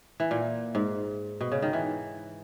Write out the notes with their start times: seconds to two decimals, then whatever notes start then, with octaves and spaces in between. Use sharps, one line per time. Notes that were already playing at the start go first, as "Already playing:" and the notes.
0.20 E3
0.31 A#2
0.75 G#2
1.41 B2
1.52 C#3
1.62 D#3
1.73 E3